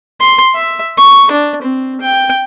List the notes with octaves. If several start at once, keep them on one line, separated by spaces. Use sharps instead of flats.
C6
E5
C#6
D4
C4
G5